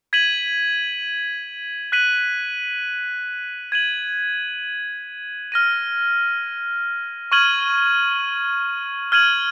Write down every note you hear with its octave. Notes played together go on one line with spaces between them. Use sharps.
G#6 B6 D#7 F#7
F#6 B6 D#7 F#7
G#6 D#7 F#7
F6 A#6 D#7
C#6 F6 G#6 D#7 F#7
F6 G#6 D#7 F#7